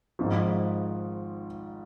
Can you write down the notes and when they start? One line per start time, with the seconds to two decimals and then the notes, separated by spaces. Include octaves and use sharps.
0.19 G#1 G#2 F3